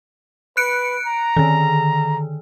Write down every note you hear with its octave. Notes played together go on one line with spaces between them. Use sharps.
B4 F#6 C#7 D7
A#5
D3 D#3